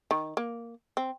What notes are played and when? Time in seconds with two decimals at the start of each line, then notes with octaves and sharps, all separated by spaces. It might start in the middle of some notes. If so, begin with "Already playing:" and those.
0.11 D#3
0.37 A#3
0.97 C4